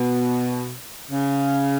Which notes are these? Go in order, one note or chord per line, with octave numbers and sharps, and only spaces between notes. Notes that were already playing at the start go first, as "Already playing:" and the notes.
Already playing: B2
C#3